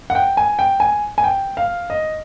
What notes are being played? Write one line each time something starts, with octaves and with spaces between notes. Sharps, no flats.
F#5
G5
G#5
G5
G#5
G#5
G5
F5
D#5